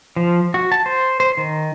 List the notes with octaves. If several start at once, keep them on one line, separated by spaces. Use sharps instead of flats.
F3
F#4
A5
C5
C5
D#3